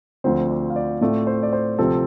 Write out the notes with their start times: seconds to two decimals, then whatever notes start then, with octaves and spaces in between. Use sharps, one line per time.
0.24 D2 D3 F3 C4 C5
0.50 D5
0.70 F5
0.76 D5
1.01 A2 A3 C4 F4 D5
1.27 C5
1.43 D5
1.53 C5
1.78 D2 C3 F3 C4 A4